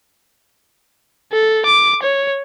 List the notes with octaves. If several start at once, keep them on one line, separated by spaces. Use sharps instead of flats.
A4
D6
C#5